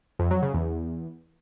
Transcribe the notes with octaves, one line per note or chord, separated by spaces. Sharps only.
F2
F#3
C#3
E2